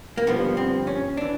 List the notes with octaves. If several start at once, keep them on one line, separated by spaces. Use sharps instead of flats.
A#3
G2 D3 F3 B3
C4
C#4
E3 D4